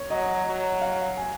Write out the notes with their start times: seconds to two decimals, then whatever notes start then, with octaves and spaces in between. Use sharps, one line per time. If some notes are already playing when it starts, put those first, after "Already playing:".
Already playing: C#5
0.10 F#3 D#5
0.46 F#3
0.82 F5
1.17 G#5